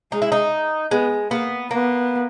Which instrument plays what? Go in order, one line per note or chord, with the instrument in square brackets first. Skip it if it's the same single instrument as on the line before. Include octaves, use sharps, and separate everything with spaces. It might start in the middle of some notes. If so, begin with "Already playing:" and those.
[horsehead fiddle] G#3 [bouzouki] D#4
[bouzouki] E4
D#4
[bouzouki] G#3 [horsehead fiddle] B3
[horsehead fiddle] A#3 [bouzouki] B3
[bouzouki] A#3 [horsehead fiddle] B3